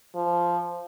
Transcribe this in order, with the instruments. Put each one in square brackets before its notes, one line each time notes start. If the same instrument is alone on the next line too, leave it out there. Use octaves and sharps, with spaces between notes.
[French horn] F3